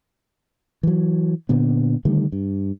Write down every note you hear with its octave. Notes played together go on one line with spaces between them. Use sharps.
E3 F#3
A#2 D3 B3
D3 D#3 G3 A3
G2